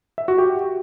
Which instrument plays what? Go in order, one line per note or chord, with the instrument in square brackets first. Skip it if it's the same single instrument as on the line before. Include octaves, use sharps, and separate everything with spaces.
[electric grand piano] E5
F#4
G4